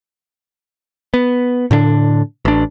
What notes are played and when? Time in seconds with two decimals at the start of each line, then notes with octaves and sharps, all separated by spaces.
1.14 B3
1.71 A2 D3 C#4 D4
2.45 A1 D4